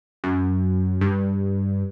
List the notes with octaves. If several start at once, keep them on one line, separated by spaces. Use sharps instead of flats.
F#2
G2